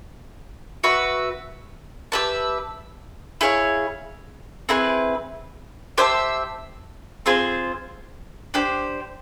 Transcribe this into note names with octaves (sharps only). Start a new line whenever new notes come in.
F#4 B4 E5
G4 B4 E5 A5
E4 G#4 C#5 F5
C4 E4 G#4 B4
G4 C5 E5 A5
C4 F4 G#4 C5
D4 G4 C5